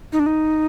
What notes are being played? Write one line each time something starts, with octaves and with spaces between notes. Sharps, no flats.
D#4
D4
D#4